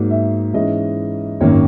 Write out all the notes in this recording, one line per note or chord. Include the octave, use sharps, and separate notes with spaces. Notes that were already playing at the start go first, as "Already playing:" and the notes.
Already playing: G#2 F#3 A#3 D#4
E5
G#2 E3 G#3 C#4 E4 D#5
G#1 F#2 D#3 A#3 C#5